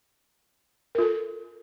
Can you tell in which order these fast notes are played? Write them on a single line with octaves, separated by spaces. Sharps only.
A#4 F4 A4